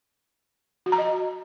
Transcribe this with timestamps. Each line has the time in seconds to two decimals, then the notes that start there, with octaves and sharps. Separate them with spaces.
0.86 F#4
0.92 A#5
0.98 D#5